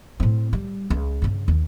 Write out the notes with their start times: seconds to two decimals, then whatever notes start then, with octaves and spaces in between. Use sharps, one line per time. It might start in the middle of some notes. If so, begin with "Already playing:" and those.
0.20 A2 C4
0.53 G3
0.90 C#2
1.22 G2 C#3
1.48 D#2